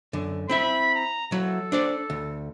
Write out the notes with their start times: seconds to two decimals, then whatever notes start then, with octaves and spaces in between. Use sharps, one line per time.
0.13 F#2 D3
0.49 C4 E4 E5 B5
0.95 A#5
1.32 F#3 E4 A4
1.72 D4 C5 D5
2.10 D2